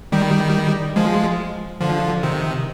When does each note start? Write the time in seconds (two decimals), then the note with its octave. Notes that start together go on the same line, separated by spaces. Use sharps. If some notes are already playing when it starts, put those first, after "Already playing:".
0.12 D#3 G3
0.96 F3 G#3
1.81 D3 F3
2.23 C3 D#3